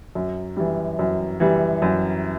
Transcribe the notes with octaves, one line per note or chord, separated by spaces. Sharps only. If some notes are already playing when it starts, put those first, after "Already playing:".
F#2
E3 G3
F#2
E3 G3
F#2